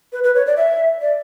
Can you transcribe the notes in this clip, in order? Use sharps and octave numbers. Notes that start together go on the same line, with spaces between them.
B4
B4
C#5
D5
E5
D5